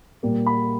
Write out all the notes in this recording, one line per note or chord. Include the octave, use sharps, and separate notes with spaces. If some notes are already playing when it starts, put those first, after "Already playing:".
A#2 G3 A#3
B5